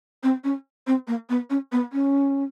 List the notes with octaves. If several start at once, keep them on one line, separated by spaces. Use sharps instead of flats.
C4
C#4
C4
A#3
B3
C#4
B3
C#4